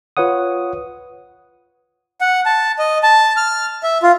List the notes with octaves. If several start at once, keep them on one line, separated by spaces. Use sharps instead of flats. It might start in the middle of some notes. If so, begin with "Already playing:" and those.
F4 B4 C#5 F#5 D#6
F#5
A5
D#5
A5
F6
E5
F4